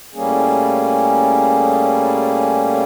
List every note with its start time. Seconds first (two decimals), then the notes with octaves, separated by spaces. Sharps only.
0.14 A2 G3 A#3 C#4 G#4